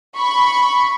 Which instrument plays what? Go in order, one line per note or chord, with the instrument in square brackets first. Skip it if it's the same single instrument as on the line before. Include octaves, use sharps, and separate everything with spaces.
[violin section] B5 C#6